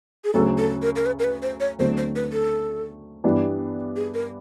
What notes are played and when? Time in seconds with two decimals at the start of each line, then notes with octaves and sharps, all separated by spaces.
0.24 G#4
0.33 D2 C#3 F#3 A4
0.58 A4
0.82 A#4
0.96 A#4
1.06 B4
1.19 A#4
1.24 B4
1.42 C5
1.60 C#5
1.78 D2 D3 F#3 A3 C4 C5
1.97 C5
2.16 B4
2.33 A4
3.24 G2 E3 G3 B3 D4
3.96 G#4
4.14 A#4